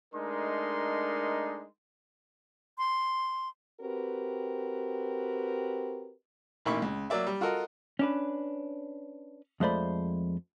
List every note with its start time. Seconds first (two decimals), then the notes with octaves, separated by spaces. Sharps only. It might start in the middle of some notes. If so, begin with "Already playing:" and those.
0.15 G#3 A3 D4 D#4 A#4 C6
2.78 C6
3.81 C4 F#4 G4 A#4 B4
6.65 A1 A#2 D#3 E4 B5 C#6
6.82 C#2
7.10 F#3 A#3 D5 E5
7.27 G3
7.41 F4 F#4 A4 A#4 D#5
7.99 C#4 D4 B4
9.60 F2 G#3 A3 C5 D5 B5